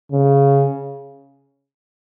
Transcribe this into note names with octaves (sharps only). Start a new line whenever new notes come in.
C#3